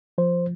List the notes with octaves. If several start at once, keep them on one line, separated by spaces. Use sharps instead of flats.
F3 C5